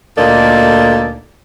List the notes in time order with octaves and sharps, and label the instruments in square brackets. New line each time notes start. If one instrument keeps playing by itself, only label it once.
[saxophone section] D2 A#2 A#3 D#4 A4 D5